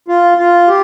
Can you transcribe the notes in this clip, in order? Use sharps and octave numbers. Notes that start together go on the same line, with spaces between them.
F4
F4
G4